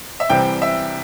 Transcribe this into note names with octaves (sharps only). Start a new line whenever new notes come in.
E5
C2 C3 E3 G3 C4 G5
E5